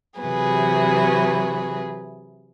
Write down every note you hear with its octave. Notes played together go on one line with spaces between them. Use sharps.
C3 E3 F#3 G#4 B4